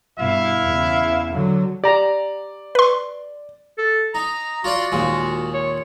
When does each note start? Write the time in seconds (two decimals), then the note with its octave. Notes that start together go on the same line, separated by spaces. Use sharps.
0.18 G2 B2 E4 E5 F5
0.64 E2 C#3
1.32 D3 F#3
1.84 G4 D5 A#5
2.75 B4 C6
3.78 A4
4.15 D#4 A#5
4.64 F4 F#4 D5 C6
4.92 D#2 A#2 G#3
5.54 C#5